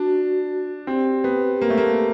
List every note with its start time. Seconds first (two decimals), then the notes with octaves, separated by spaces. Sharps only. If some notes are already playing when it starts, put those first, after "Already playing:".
Already playing: D4 F#4
0.87 C4 G4
1.24 B3
1.61 A#3
1.70 A3
1.78 A#3